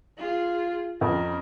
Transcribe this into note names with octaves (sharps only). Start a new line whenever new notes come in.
F4 G#4
F2 C#4 A#4